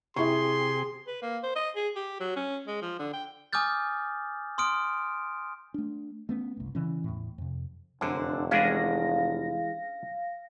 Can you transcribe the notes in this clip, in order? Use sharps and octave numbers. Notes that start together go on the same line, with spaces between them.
C3 E4 G4 G#4 G#5 C6 C#6
B4
A#3
C5
D#5
G#4
G4
F#3
C#4
G#3
F3
D3
G5
G#5 D6 D#6 F6 G6 A6
C6 D#6 F6 D7
A3 D4
A3 B3 C#4
F#1 C2
C#3 E3 C#4
E2 A2
F2 C3
F1 F#2 D3 D4 C5
E3 G#3 C#4 D4 G#4 F5 A#6